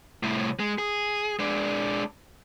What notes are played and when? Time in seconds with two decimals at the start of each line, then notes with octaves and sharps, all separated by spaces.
0.23 C2 A2
0.59 G#3
0.78 G#4
1.39 G#3 D4